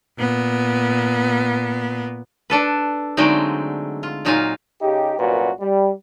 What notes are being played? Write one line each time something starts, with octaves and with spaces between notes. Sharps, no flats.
A#2 B3
D4 A4 B4
D3 F#3 G#3 A3 C4 D#4
F4
A#2 F#3 D#4 F4 F5 G#5
C#3 D#4 G4
C2 F#2 A#2 F#4 B4
G3